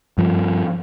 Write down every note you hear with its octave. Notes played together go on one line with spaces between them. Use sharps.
G2 F3